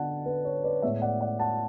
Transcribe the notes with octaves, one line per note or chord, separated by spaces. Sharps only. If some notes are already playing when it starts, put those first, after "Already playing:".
Already playing: D3 B3 F#5 A5
B4
C#5
B4 D5
A2 G#3 B3 C#5 E5
D5 F#5
D5 F#5
F#5 A5